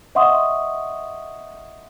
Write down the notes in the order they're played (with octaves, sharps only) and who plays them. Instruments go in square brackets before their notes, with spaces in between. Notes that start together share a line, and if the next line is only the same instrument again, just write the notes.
[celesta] D#5 E5 F#5 C6 C#6 D#6